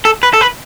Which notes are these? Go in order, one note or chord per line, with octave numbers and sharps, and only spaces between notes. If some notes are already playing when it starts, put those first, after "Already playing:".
A4
B4
A4
B4